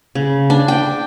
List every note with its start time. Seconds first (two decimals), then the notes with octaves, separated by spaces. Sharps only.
0.15 C#3
0.50 D4
0.68 G5